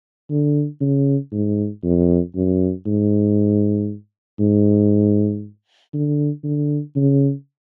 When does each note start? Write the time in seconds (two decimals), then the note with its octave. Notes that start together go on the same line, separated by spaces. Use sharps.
0.30 D3
0.81 C#3
1.32 G#2
1.83 F2
2.35 F#2
2.86 G#2
4.40 G#2
5.94 D3
6.44 D3
6.96 C#3